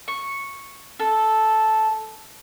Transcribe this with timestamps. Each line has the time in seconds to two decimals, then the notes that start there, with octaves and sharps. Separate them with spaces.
0.08 C#6
1.00 A4